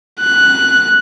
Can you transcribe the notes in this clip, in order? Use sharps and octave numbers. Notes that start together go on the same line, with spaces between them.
F#6